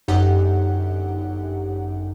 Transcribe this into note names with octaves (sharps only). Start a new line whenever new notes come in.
G1 F#2 D#4 G4 F#5